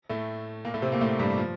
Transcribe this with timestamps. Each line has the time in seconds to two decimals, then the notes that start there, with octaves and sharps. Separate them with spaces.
0.09 A2 A3
0.65 A#2 A#3
0.74 A2 A3
0.82 C3 C4
0.92 A#2 A#3
1.01 A2 A3
1.19 G2 G3
1.38 F3